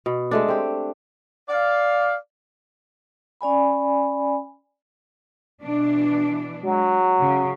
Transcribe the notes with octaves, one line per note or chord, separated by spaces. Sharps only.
B2
G#3 A3 D4
C4 G4
D5 F5
C#4 D5 G#5 B5
B2 E3 D4
F#3 G#3
C#3